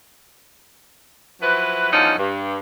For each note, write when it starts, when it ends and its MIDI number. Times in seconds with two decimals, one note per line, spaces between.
1.40 1.89 53
1.40 1.89 54
1.40 1.89 64
1.40 1.89 71
1.91 2.14 40
1.91 2.14 50
1.91 2.14 53
1.91 2.14 54
1.91 2.14 61
1.91 2.14 63
2.17 2.57 43